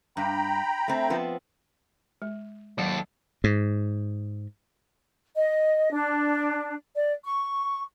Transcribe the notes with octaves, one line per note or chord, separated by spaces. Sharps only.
G2 G5 A#5 B5
A3 C4
F3 B3 C4
G#3
D#2 F#3 A4 F#5
G#2
D#5
D4
D5
C#6